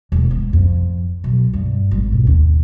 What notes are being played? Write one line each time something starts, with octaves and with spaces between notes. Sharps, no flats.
E1
G#2
F2
B1
G2
G#1
B2
D#2